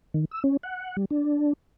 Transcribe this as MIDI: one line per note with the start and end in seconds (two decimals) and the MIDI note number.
0.14 0.25 51
0.31 0.43 88
0.44 0.57 61
0.63 0.96 78
0.97 1.05 55
1.11 1.53 62